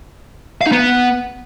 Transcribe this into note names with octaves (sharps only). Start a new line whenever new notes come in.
F5
D#4
B3